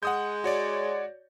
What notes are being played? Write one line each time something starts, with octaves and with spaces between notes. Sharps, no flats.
G#3 F#5 D#6 G6
F#4 C#5 D5